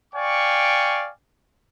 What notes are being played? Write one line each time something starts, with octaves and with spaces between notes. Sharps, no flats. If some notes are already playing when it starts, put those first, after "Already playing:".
D5 F5 G5 G#5 C#6